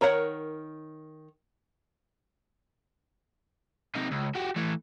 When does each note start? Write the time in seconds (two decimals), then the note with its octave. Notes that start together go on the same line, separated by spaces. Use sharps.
0.01 D#3 A#4 C#5 F#5
3.96 C3 D#4
4.11 C#2
4.35 F#4 G4
4.56 E3 A3